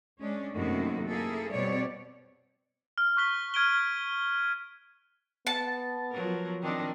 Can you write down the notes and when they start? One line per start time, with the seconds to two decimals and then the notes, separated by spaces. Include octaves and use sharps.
0.20 G#3 C#4 D4
0.53 F#2 C3 D#3 A3 A#3 F#4
1.09 A#3 E4 G#4 A4
1.54 B2 G3 C4 C#5 D5
2.98 F6
3.17 C#6 F#6 B6 G7
3.54 F6 G#6 D7 D#7 G7
5.47 B3 A5
6.12 F3 F#3 A#4
6.62 D#3 C4 D4